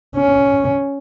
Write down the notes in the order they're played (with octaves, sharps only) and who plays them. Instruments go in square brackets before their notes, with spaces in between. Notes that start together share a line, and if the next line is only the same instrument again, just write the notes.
[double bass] C#4